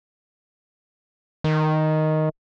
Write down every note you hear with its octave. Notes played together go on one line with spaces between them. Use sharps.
D#3